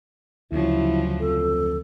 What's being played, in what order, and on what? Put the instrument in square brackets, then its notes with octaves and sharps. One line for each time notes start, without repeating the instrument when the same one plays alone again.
[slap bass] D2 [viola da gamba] C#3 F3 F#3 [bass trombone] E4
[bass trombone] F2 [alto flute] A4